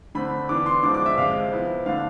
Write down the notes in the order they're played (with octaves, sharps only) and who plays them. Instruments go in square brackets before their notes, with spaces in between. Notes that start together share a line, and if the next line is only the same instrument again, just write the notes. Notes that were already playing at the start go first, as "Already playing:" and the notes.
[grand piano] D3 A3 C4 B5
E3 B3 D4 D6
C6
D3 F3 G#3 D4 D6
D6
E5
C3 F3 G#3 F5
F3 B3 E4
D3 A3 D4 F5